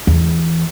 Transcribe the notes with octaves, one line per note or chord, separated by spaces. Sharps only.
E2